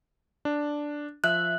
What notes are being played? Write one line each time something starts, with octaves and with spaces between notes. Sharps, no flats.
D4
F3 E5 F#6